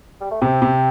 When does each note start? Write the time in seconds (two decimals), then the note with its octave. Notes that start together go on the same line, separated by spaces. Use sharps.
0.21 G3
0.32 A3
0.42 C3 C4
0.62 C3